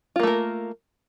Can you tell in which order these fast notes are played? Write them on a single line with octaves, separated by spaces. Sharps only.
F4 A#3 A3 A#4